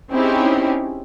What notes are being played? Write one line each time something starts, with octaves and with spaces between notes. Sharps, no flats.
C4 C#4 D#4 E4 G4 G#4